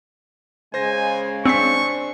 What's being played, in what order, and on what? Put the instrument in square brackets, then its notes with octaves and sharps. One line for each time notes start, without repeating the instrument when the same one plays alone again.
[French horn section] C#3 G#3 [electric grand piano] C5 A#6 [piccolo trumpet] G#5
[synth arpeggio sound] C4 F5 B6 [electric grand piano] D4 C5 G#5 [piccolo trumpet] C#6